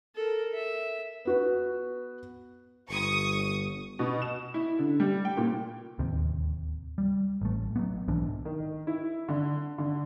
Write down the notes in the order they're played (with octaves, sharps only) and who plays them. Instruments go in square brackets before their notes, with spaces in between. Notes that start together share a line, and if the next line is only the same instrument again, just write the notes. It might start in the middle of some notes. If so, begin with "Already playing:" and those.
[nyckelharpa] A4 A#4
E5
[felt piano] B3 F#4 B4
[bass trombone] G1 [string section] C#6 D#6
[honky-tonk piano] B2
E7
E4
D3
G3
G5
A#2
[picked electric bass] D1 D#2 C3
G3
A1 A3
F#3 A3 B3
B1 G#2 E3 D4
[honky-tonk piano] D#3
E4
D3
D3